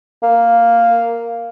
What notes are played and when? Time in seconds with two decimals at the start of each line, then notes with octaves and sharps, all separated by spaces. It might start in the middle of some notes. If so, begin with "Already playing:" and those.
0.23 A#3